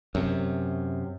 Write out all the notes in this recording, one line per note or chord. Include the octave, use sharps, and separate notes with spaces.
F#2 C3